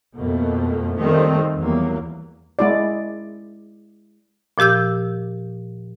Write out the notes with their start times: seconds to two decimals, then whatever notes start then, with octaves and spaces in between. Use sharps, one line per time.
0.17 F2 B2 A3 A#3
0.95 D#3 F3 G3 A3 C4
1.57 E2 F#3 G3 A#3
2.59 G#3 E4 D5
4.58 A#2 F3 G4 E6 G6